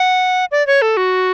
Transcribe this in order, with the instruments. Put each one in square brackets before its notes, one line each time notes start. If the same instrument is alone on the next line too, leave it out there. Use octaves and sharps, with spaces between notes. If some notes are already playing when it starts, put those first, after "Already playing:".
Already playing: [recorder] F#5
D5
C#5
A4
F#4